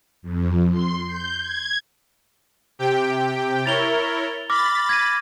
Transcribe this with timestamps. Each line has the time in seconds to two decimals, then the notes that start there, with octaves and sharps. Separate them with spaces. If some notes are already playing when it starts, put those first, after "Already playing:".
0.22 F2
0.71 C6
1.07 G6
1.41 G#6
2.79 C3 G4 G5
3.66 E4 A#4 C#5 A6 F7 G7
4.50 B5 D6 F6 A6 A#6
4.89 G#6 A#6 D#7